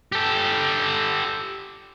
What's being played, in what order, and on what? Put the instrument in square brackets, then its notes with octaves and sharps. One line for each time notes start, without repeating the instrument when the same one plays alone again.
[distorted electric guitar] G4 A4